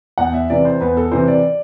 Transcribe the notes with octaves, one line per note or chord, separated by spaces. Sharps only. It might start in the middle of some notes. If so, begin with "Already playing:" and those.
E2 F#5
E5
C3 E3 D5
C5
E2 B4
A4
C3 E3 C5
D5